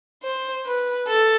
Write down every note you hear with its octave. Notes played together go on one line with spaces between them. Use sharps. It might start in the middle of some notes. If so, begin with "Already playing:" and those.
C5
B4
A4